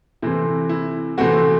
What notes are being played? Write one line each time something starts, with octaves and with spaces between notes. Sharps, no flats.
C3 E3 A3 C4 E4
E4
C3 E3 A3 C4 E4 F#4